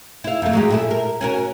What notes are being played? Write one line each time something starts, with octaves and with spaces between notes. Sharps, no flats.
E4 F5
F2 A3
F#3 G#3 G4
A#2 E4 A4
A#4
C#4 F#4 A#4